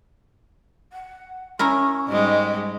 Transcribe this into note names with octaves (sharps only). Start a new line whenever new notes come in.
F#5
C#4 E4 A#4 C#6
G#2 G3 G#3 D#5